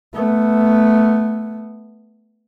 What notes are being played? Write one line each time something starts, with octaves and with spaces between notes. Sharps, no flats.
A3 B3